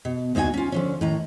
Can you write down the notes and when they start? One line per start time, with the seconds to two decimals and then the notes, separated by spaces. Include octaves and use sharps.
0.05 B2
0.35 D2 A#3 D#4 F#4 G#5
0.54 C#4 F4
0.72 D3 F3 C#4
1.01 A2 D#3 A#5